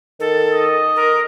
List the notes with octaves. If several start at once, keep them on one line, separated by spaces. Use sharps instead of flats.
D#3 A4
D#5
A#4